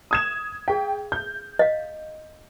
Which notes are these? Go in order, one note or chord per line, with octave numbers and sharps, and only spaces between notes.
D#6 G#6 E7
G#4 F5 G5
G6
D#5 F5